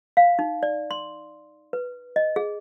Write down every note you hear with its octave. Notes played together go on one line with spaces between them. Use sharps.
F5
D#4
D5
C6
B4
D#5
G#4